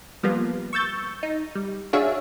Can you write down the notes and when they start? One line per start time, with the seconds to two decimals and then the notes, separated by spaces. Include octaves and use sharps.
0.23 F3 G3 A#3 B3 F4
0.73 C#6 E6 G6 A6
1.23 D#4
1.55 G3
1.93 D4 F#4 G#4 C#5 E5 F5